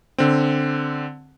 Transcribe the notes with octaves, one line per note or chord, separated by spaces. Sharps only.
D3 C4